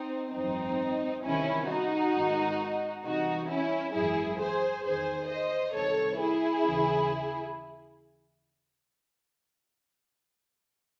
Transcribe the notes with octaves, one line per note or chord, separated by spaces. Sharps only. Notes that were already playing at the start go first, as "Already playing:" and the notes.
Already playing: C4 D#4
G#1 F#2 E3 C4 D#4
C2 C3 D#3 C#4 E4
D#4 F#4
G#1 G#2 D#3
C2 C3 E3 D#4 F#4
C#4 E4
G#1 F#2 E3 E4 G#4
G#4 C5
E2 D#3 G#4 C5
C5 D#5
C2 C3 D#3 A4 C#5
E4 G#4
D#2 C#3 E3